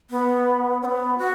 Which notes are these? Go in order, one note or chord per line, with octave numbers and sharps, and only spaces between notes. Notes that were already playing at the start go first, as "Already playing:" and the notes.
B3
C#4
B3
F#4